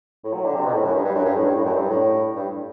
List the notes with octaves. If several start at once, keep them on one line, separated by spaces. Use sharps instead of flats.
A2
F#3
D3
C3
B2
A2
F#2
G2
G2
F#2
G2
A2
G2
A2
F#2
G2
A2
G2